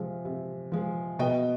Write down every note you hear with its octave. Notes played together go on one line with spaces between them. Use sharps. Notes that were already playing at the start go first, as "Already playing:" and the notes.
Already playing: C3 F3 G#3
C3
F3 G#3
B2 D#5 G5